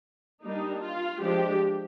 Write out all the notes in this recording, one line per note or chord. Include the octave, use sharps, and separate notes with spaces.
G3 A#3 D4 D#4
F4
F3 G#3 D4 G4